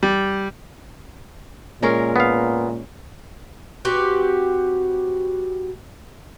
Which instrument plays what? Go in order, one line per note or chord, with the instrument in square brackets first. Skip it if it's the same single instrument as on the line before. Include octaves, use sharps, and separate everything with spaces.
[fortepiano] G3
[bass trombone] A#2 [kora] G#3 C#4 A#4
[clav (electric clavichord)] B3 F5
[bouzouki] C4 F#4 G4 B4